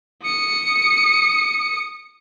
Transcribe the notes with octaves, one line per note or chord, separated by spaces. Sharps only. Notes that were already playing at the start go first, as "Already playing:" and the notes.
D#6 C#7